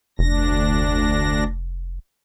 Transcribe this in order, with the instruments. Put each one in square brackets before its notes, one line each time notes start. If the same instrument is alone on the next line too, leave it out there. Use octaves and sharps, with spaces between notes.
[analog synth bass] F1 [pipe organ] D2 D4 A#6